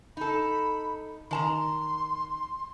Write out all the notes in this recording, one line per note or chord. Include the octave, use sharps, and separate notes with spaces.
D#4 A4 B5
D#3 A5 A#5 C6